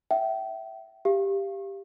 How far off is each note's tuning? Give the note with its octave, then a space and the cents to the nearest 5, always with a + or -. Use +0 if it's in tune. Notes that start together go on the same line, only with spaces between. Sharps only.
E5 +0 G5 -30
G4 +5 F5 -25